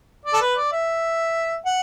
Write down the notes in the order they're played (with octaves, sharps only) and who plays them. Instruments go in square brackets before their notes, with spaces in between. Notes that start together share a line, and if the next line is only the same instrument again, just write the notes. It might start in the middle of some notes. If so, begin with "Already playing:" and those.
[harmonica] D5
A4
B4
D5
E5
F#5